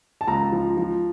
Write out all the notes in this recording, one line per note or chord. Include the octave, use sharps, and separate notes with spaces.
A5
C#2 A#5
F3
F3